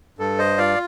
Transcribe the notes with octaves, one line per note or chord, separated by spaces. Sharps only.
G2 A4
C5 D#5
F4 D5 F5